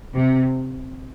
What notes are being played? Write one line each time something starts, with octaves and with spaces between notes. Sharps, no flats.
C3